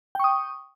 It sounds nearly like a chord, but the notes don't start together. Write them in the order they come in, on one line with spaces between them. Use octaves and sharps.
G5 C#6 D#6